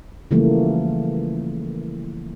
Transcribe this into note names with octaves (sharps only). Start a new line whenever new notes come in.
C#3 E3 F3 G3 A3 A#3